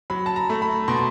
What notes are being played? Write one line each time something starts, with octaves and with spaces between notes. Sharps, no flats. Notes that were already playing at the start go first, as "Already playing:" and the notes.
F#3 B5
A5
A#5
A3
B5
B2 C6